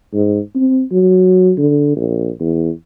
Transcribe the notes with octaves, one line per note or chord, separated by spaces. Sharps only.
G#2
C4
F#3
D3
A#1
E2